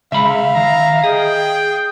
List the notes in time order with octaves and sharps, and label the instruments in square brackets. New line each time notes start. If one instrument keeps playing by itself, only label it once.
[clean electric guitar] C#3 G#3 B5 [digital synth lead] E5 [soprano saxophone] F5
[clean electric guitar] D#3 [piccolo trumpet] A#5
[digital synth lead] G#4 [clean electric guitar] D#5 [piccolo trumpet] G5